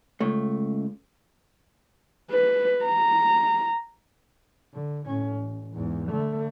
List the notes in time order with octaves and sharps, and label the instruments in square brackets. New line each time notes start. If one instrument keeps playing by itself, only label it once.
[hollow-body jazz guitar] C#2 A3
[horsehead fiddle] B4
A#5
[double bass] D3
A2 C#4
A1
E2 G#2
D3 A3